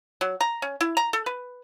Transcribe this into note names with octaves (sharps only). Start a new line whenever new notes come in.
F#3
A#5
C#4
E4
A#5
A4
B4